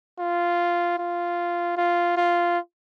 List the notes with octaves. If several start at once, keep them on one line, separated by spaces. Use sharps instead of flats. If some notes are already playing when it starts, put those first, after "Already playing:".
F4
F4
F4
F4